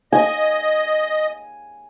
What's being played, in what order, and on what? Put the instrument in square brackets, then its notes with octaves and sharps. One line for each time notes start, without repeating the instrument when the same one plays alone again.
[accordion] D#5 [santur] G#5